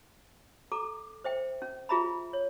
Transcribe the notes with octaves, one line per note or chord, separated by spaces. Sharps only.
A4 A#5 D6
C5 E5 G5
C#4
F4 G#4 E5 A#5 B5
C#5